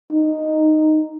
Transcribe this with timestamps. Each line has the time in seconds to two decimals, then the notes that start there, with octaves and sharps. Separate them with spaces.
0.13 D#4